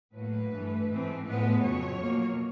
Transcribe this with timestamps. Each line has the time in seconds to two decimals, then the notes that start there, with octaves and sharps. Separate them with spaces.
0.15 A2 F#3 A#3 B4
0.52 G2 E3 A3
0.89 G#2 E3 A3 C4
1.25 A2 F3 G#3 B3 B4
1.61 F2 C#3 F#3 C#5
1.98 B2 F#3 A#3